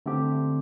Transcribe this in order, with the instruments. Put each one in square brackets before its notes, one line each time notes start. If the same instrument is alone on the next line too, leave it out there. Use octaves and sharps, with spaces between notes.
[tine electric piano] D3 A3 C4 G4